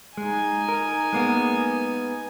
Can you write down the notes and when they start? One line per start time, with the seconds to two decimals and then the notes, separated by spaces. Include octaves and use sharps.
0.17 G#3 D#4 G#5
0.69 A#4
1.13 G#3 A#3 B3